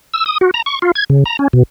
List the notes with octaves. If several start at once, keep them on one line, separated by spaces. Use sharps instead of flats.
E6
D#6
F#4
A#5
C#6
F4
G#6
C#3
A#5
C#4
B2